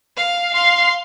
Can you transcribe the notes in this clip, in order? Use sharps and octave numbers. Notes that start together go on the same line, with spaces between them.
F5
F5 C6